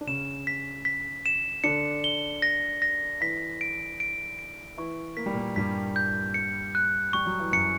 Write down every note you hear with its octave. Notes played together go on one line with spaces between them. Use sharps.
D4
C#3 C#4 E7
B6
B6
E7
D3 D4 C#7
G7
A#6
A#6
E3 E4 B6
D7
D7
D7
E3 E4 C#6
A#3 B6
G3
A#2 A#3
G2 G3 B6
G6
C#7
F#6
G3 C#6
F#3
E3
F#2 F#3 C#7